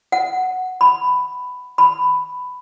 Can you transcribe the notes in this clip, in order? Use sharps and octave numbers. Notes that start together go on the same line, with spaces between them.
F#5
B5
B5